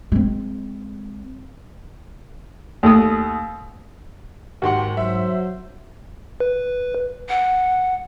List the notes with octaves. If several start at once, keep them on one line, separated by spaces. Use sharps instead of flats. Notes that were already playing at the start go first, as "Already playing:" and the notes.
G#3 C4
D#2 A3 D#6
D#2 G#2 F#4 G4 F#5 C6
F#3 C5 E5
B4
F#5